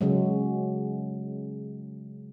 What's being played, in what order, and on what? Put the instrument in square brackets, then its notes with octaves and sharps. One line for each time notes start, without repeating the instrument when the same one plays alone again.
[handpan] C#3 F#3 G#3